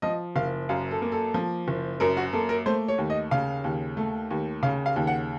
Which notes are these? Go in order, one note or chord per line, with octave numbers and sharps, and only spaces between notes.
F3 D#5
F#1 F5
F#2 F5
A4
A#3
A4
F3
F#1
F#2 A#4
F#4
A#3 A4
A#4
A3 C5
C#5
D#2
D#5
C#3 F5
D#2
A3
D#2
C#3 F5
F5
D#2
F#5